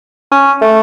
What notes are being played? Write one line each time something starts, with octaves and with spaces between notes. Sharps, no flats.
C#4
A3